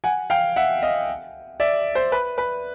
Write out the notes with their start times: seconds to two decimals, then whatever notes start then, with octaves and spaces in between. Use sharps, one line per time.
0.04 F#5 G#5
0.30 F5 G5
0.56 E5 F#5
0.82 D#5 F5
1.60 D5 E5
1.95 C5
2.12 B4
2.38 B4